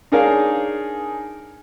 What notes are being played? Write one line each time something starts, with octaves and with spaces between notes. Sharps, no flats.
D4 D#4 G#4 A#4 C#5 F5